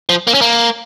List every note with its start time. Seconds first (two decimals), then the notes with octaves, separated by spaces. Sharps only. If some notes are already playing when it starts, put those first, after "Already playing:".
0.09 F3
0.27 A#3
0.34 C#4
0.41 A#3